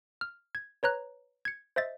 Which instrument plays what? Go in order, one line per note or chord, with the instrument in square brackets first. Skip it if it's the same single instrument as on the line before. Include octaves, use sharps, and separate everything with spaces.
[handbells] F6
G#6
B4 C#5 A#5 F#6
G#6 C#7
C5 D#5 E5 A6